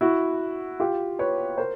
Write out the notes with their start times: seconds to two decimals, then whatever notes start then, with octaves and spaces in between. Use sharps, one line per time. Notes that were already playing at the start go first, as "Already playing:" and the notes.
0.01 E4 F#4
0.80 F4 G4
1.19 B4 C#5
1.58 A#4 C5